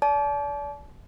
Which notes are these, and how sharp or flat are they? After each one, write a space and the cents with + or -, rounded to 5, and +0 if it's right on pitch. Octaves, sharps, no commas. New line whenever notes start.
D5 -30 A5 -35